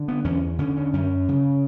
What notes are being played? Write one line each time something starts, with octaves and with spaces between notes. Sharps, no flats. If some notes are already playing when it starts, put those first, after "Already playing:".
Already playing: D3
B3
E2 C#4
D3 C#4
C#4
F#2 C#4
C#3